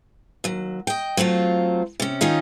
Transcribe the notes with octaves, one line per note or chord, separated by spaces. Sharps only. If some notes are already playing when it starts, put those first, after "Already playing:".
D#2 F#3
D#5 G5
F#3 A3 C4 F4
C3 C#4
D#3 C#4 D#4 F4